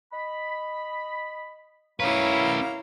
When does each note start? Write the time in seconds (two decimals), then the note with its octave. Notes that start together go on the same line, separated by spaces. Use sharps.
0.13 D#5 B5
2.00 F#2 G3 C#4 E4 B4 C#5 F5 A#5